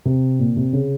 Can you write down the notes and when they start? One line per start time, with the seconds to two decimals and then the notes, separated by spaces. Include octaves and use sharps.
0.05 C3
0.39 A#2
0.56 C3
0.73 C#3